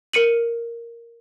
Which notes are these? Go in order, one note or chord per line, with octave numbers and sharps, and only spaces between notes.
A#4 C#7 D#7 F#7